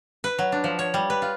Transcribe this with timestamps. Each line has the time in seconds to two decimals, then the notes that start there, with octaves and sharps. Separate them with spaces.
0.24 B4
0.39 F#3
0.52 D4
0.64 F3
0.79 C#5
0.94 G3
1.10 B4
1.22 F4